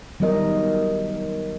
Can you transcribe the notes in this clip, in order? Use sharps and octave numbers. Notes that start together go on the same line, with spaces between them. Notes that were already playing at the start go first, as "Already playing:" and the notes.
D#3 F#3 G3 B3 A#4 D#5